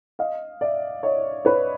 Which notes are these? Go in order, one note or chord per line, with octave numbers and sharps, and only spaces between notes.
D#5 F5
D5 E5
C#5 D#5
B4 C#5